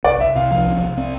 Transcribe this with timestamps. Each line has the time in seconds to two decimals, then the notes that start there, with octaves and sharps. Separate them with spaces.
0.04 C2 D5
0.20 C2 E5
0.36 C3 F5
0.51 F3 F5
0.66 C2
0.81 C2
0.97 C4